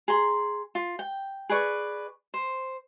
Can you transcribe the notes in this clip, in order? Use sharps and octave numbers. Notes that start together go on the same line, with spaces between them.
G#4 A#5 C6
F4
G5
G#4 B4 D5 C#6
C5